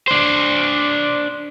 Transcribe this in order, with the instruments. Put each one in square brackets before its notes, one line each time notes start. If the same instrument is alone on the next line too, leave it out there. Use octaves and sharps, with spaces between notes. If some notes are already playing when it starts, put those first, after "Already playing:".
[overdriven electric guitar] D4 C5